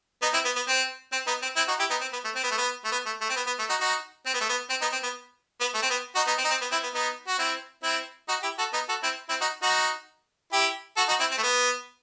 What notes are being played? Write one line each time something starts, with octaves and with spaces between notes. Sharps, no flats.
B3 D#4
C4 E4
B3
B3
C4
C4
B3 D#4
C4
C4 E4
D#4 F#4
E4 G4
B3 D#4
C4
B3
A3
C4
B3
A3
B3
A3
B3
A3
A3
C4
B3
B3
A3
D#4 F#4
D#4 F#4
C4
B3
A3
B3
C4
B3 D#4
C4
B3
B3
A3
C4
B3
D#4 F#4
B3 D#4
C4
D#4
C4
B3
C4 E4
B3
B3 D#4
F#4
C4 E4
C4 E4
D#4 F#4
E4 G4
F#4 A4
B3 D#4
F#4 A4
C4 E4
C4 E4
D#4 F#4
D#4 F#4
E4 G4
F#4 A4
D#4 F#4
C4 E4
C4
A3
B3